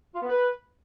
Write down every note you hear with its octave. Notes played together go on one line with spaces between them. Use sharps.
F4
B3
B4